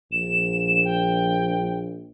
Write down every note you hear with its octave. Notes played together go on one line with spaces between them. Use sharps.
A#1 E7
G5